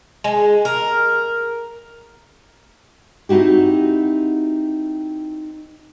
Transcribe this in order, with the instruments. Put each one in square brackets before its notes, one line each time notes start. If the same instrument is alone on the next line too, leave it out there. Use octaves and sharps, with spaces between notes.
[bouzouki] G#3
A#4
[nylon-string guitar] C4 D#4 E4 F#4 G4